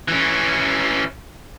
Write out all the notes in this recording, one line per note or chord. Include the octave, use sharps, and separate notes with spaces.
E3 C#4